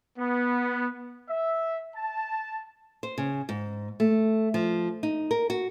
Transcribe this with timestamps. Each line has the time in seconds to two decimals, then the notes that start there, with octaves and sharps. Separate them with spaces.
0.18 B3
1.29 E5
1.95 A5
3.03 C5
3.18 C#3
3.49 G#2
4.00 A3
4.54 F3
5.03 D#4
5.31 A#4
5.50 F#4